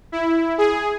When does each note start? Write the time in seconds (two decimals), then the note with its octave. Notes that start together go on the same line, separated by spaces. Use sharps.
0.12 E4
0.58 G#4